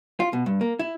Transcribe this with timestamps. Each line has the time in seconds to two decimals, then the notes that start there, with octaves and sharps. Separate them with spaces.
0.20 F4
0.33 B2
0.46 G2
0.61 A#3
0.79 E4